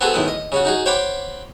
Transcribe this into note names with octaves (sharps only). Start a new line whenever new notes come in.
B3 C4 F#4 G#4 A4
A2 D#3 G#3 B3
D#5
C#3 C#4 F#4
D#4 F#4 G#4
C5 C#5 F#5 G5 B5 D6